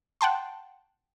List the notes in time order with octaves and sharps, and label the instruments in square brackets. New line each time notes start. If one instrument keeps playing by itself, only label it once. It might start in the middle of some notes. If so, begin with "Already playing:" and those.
[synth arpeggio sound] F#5 G5 A5 C6